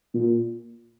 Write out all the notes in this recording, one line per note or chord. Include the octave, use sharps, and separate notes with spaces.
A#2